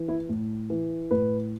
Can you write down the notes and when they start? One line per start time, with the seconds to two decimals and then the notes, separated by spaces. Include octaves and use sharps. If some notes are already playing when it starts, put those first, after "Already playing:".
Already playing: E3
0.08 E4
0.29 A2
0.70 E3
1.11 A2 B4